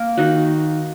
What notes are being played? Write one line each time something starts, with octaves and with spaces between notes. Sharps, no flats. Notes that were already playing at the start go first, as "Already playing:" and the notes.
Already playing: A#3 A#4
D#3 D#4 F#4